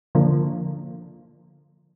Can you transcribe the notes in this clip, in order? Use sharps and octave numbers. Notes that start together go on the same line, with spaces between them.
D3 F3 A#3